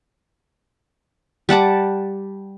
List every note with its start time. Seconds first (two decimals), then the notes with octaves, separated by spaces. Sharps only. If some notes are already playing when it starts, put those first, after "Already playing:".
1.49 G3 F#5 A5 D6